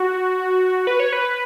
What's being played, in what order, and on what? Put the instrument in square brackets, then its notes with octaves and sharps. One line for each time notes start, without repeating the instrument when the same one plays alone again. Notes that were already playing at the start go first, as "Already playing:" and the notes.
Already playing: [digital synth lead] F#4
B4
C#5
B4